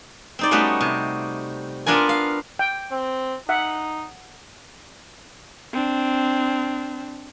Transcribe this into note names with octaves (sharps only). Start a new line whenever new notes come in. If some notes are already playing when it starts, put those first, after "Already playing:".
C4 D#4 D5
G3 A3 B3 C#4 D#4 F#4
C3
B3 D4 F4 A#4 G#5
F5
G5
C4
D#4 E5 F#5
C4 D4